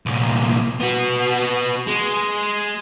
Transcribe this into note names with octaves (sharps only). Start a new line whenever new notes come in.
C2 A#2
B3 F#4
G#3